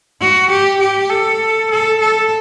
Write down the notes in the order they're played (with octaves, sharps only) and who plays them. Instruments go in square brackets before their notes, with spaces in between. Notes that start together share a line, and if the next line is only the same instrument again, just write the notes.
[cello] F#4
G4
G4
A4
A4
A4